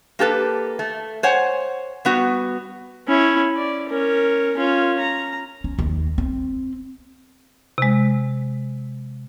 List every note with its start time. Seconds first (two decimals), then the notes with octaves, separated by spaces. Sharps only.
0.19 A#3 G4 A4 B4
0.79 A3
1.23 C5 C#5 F#5 G#5
2.05 G3 B3 F#4
3.08 C#4 E4
3.56 D5
3.89 C#4 A#4
4.57 C#4 F4
5.00 A#5
5.64 C#4
5.79 D#2
6.18 C4
7.78 C3 G#3